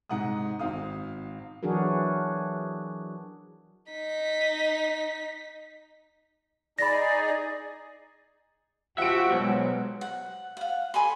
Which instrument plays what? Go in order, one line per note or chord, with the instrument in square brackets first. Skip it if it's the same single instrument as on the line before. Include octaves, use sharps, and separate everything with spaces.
[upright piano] G#2 C3 F#5 A#5 D#6
G#1 C4 F5 D#6
[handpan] E3 F#3 D4 F#4 G#4 A#4
[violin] D#4 B6
[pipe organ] D#4 G#4 [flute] D5 [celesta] B5 A#6
[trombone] F3 [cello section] F#4 G4 [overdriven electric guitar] E5 [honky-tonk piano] F#5 D7
[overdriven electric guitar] B1 [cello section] G#3 [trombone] C5
[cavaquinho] F#5
F5 F#5
A4 G#5 B5 C6